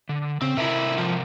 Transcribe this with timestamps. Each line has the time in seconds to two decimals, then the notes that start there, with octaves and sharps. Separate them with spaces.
0.09 D3
0.42 C#3 C4
0.57 C3 E4 A4 A#4 E5
0.98 F3